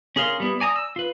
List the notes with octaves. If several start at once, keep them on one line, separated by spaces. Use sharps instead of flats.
C#4 G#4 A#4 F5 C6
G3 B3 E4
D5 G#5 A#5 D#6
E6
F4 B4